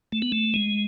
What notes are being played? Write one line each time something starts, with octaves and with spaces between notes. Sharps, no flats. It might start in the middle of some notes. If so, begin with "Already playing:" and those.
A3
B3
A3
G#3